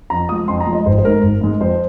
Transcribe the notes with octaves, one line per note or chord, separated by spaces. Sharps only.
F2 A#5
F3 G#3 D#6
F2 C6
A#5
F3 G#3
D#5
G#1 C5
C5
G#2 G#3 A#4
G#1
G#2 G#3
F2 C5